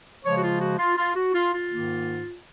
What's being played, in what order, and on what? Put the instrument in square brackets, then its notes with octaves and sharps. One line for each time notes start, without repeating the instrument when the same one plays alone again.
[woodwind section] C#3 F3 G#3 C#5
F#4
F4
F#4
F4
F4
F#4
F4
F4
G#2 D#3 A#3